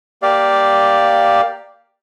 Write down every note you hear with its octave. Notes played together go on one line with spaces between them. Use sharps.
A#3 G4 D5 F5